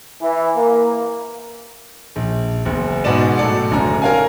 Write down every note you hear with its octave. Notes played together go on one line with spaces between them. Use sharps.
E3
A#3
A#1
F#1 E2
G#2 B2 G#3 B3 D5 E7
A2 F#3 A4 D5 C#7
F#1 F#2 D3 A#5
A#4 C#5 F5 G5 G#5